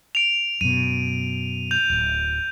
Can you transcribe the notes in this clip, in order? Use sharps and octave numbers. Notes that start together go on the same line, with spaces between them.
D7 F7
F#2 B2 D#7
G6 F7
D1